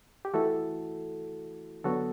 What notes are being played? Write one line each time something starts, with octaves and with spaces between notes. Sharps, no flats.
G4
E3 A3 E4 F#4 A4
D3 F#3 B3 F#4 A4